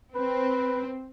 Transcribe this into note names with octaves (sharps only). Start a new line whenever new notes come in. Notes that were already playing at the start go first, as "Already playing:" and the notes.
C4 B4